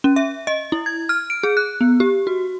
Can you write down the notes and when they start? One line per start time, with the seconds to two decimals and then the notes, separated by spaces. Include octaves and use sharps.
0.04 C#4
0.16 E5
0.47 D#5
0.72 E4
0.86 G#6
1.09 F6
1.30 D7
1.43 G#4
1.57 F#6
1.81 B3
2.00 G4
2.27 F#4